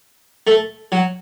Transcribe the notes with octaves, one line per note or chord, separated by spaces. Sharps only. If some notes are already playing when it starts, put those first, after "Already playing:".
A3
F#3